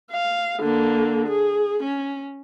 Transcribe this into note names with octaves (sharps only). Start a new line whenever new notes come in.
F5
D3 A#3
G#4
C#4